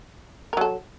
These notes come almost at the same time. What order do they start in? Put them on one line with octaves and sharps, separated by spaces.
A#4 F#3 A4